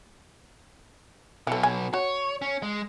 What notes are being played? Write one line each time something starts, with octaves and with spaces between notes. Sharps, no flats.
B1 B2 E3 A4
G#5
F#4 C#5
C#4
G#3